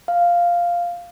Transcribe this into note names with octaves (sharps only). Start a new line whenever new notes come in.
F5